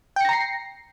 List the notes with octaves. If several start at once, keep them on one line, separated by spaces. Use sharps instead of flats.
G5 A#5 A#6 C7 C#7